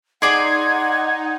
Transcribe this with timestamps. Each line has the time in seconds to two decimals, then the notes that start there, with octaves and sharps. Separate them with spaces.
0.22 D#4 G#4 D5 F#5 C6 G#6